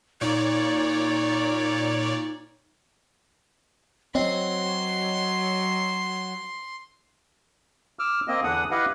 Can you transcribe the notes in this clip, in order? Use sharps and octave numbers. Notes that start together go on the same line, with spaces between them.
A#2 D#4 C#5 D5
F#3 C4 C#5 D#5 G5 C6
D6 E6 F6
A#3 C4 D#5
E2 D3 D4 F#5 D#6
E4 G4 B4 D#5 F5 F#5